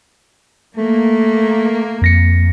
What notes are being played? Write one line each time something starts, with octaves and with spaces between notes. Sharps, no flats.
A3 A#3
F2 A#6 C#7